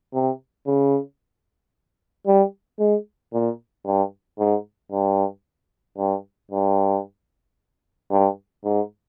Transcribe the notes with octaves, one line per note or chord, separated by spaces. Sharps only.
C3
C#3
G3
G#3
A#2
G2
G#2
G2
G2
G2
G2
G#2